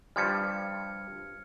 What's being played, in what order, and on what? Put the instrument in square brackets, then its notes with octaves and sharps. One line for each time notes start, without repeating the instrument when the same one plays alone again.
[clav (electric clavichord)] G2 F3 G3 [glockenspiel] F6 G#6 C#7